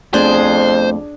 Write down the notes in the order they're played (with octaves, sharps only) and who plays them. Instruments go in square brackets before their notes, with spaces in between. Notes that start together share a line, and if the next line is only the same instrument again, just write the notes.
[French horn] F2 [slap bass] A3 B3 C4 [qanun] D4 G#4 [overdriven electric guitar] C5